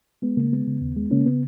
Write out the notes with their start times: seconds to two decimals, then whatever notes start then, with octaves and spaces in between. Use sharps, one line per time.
0.22 G#3 B3
0.37 C#3 A#3
0.53 G#3 B3
0.67 C#3
0.81 D#2
0.96 G#3
1.11 C#3 A#3 C#4
1.26 C#3 B3